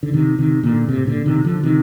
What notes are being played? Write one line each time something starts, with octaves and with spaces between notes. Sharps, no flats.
D3
C3 D#3
C3 D#3
A#2 D3
A2 C3
A#2 D3
C3 D#3
D3 F3
C3 D#3